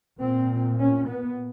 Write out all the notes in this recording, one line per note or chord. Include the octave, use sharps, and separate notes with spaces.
A#2 C4
C#4
B3